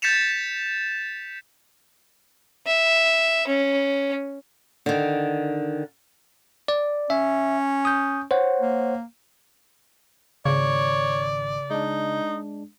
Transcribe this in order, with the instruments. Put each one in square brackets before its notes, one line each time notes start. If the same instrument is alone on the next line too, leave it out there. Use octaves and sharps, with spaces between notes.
[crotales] G6 A6 B6 C#7 E7 F7
[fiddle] E5
C#4
[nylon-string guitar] D3 D#3
[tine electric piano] D5
[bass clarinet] C#4 [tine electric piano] E5
[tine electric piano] D#6 G6
C5 C#5 F#5
[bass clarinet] A#3
[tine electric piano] G#1 [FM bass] C#3 [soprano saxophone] C#5 [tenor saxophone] D5
[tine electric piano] G#3 D4 [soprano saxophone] D#4